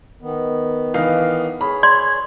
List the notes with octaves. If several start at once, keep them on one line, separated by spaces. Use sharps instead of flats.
D#3 B3
E3 D#4 F5
G#4 C#5 B5
D5 C6